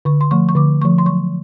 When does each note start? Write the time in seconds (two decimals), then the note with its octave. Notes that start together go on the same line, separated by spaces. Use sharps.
0.05 D3 C#6
0.21 C6
0.31 F3 A3 C#6
0.49 C#6
0.55 D3 D6
0.81 F3 A3 C#6
0.98 C6
1.06 F#3 C#6